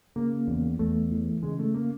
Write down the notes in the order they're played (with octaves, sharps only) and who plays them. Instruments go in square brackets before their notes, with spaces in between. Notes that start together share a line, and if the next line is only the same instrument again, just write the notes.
[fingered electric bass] C#3 [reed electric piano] A#3
[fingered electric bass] E2
[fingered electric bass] E2 [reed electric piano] A3
[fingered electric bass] E3
[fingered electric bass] C#3 [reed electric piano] G#3
[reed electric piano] A3
A#3